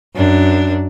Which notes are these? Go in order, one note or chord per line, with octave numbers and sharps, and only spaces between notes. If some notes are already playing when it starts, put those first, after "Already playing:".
F#2 D4